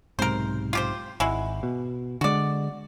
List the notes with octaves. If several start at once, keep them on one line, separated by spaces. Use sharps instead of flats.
B1 G#2 C3 A#4 C5
F4 G4 C5
G#1 G#3 E4 F#4
B2
D3 G#3 F#4 D5